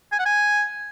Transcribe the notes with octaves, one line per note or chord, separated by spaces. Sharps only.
G#5
F#5
G#5